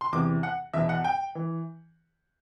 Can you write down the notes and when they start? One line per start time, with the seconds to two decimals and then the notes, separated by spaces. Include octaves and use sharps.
0.01 C6
0.12 E2 C3 E3 D6
0.43 F#5
0.73 E2 B2 E5
0.89 F#5
1.04 G5
1.35 E3